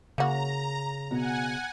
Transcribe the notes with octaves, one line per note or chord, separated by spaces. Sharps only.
C#3 A#3 F#4 A#5
B2 F#5 G#5